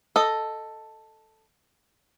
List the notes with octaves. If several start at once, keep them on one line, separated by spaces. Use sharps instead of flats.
A4 D#5